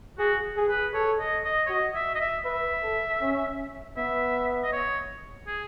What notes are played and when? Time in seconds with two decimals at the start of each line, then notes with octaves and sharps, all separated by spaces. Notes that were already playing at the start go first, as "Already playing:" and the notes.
0.19 F#4 G#4
0.57 G#4
0.69 B4
0.94 A4 C#5
1.19 D#5
1.45 D#5
1.66 C#5
1.69 F#4 D#5
1.95 E5
2.15 D#5
2.20 E5
2.45 B4 E5
2.83 A4
3.21 C#4
3.97 B3 E5
4.63 D#5
4.73 C#5
5.47 G#4